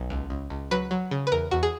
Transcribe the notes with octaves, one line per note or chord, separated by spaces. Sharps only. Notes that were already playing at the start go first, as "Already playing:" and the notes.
Already playing: B1
C#2
C#2
C#2
F#3 B4
F#3
C#3
B4
E2 A#4
E2 F#4
G#4